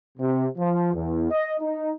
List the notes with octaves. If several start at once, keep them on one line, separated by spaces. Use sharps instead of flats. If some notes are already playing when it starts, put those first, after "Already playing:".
C3
F3
E2
D#5
D#4